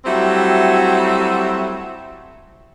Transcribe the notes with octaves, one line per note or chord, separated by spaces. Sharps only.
F#3 G3 A3 C4 E4 F#4